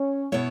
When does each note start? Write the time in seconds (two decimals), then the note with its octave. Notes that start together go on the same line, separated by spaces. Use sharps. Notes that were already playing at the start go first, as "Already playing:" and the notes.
Already playing: C#4
0.32 B2 B3 E4 C#5